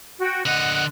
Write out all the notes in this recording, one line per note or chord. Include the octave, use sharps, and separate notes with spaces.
F#4 G5
D3 D#5 F#5 F#6